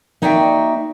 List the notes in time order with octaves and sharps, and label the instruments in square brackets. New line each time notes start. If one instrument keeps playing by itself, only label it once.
[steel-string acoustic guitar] A#3 D#4 F#4 D5 E5 G5